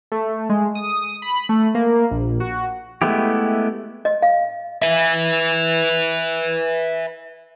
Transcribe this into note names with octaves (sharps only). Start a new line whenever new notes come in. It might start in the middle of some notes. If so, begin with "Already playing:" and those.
A3
G#3
D#6
B5
A3
A#3
A#1
F#4
G#3 A3 B3 E4 G4
D#5
F5
B4 E5